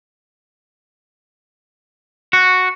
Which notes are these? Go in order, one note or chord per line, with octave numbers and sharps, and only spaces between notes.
F#4